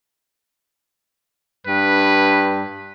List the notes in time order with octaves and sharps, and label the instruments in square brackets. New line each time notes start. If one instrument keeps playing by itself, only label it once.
[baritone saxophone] G2 [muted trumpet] B4